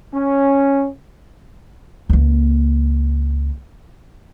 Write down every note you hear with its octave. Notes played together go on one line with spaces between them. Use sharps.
C#4
C#2 A#3